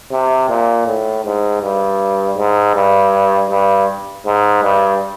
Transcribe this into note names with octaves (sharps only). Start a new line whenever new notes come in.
C3
A#2
A2
G#2
G2
G#2
G2
G2
G#2
G2